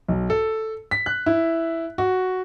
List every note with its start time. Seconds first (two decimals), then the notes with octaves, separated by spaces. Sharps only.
0.09 B1
0.30 A4
0.91 B6
1.06 F#6
1.26 E4
1.98 F#4